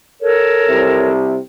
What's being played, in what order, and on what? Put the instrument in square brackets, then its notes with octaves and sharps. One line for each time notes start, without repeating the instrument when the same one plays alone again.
[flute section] A4 A#4 C#5
[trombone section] C2 C3